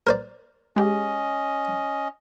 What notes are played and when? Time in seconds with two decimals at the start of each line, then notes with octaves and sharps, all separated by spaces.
0.07 A#4 C5 D5
0.76 G#3 C#4 G4 G#4 D#5